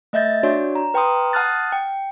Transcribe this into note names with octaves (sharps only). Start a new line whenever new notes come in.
A3 D#5 E5 G6 A6
D4 F#4 C#5 D5
A#5
B4 G5 A#5 C6 D#6
F#5 A5 D#6 F6 F#6 A6
G5